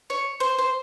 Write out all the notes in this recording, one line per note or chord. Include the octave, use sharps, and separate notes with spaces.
C#5
C5
C5